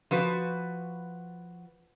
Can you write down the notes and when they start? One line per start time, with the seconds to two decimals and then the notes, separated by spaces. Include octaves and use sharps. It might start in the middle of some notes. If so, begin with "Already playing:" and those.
0.11 F3 F#4 B4